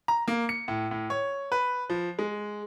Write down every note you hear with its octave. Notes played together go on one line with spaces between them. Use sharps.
A#5
A#3
C#7
A2
A2
C#5
B4
F3
G#3